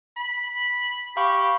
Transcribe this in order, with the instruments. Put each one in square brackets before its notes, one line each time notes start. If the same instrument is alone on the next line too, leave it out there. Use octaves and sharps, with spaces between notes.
[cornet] B5
[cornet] G4 [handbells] F5 B5 C#6